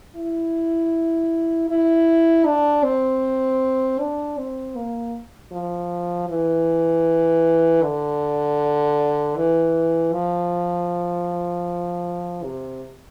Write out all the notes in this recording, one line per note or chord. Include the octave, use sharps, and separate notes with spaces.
E4
E4
D4
C4
D4
C4
A#3
F3
E3
D3
E3
F3
C3